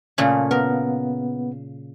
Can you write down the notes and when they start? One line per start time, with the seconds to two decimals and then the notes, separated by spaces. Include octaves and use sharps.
0.18 A#2 C#3 A3
0.51 B3 A#4